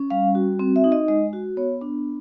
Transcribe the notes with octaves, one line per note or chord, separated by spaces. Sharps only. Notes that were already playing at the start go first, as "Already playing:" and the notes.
Already playing: C#4
G3 F5
F#4
C4
E5
D#4
D#5
G#3 D#5
F#4
B3 C#5
D4